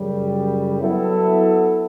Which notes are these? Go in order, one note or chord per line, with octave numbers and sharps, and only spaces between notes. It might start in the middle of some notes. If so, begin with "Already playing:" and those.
Already playing: F#2 C#3 G3
F#3 B3 E4 A4